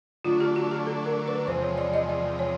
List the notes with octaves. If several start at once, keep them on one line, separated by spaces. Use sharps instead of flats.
D3 F#3 A3 D4 F4
G4
F#4
G4
A4
A#4
B4
E2 C3 F3 G#3 C5
C#5
D5
D#5
D5
C#5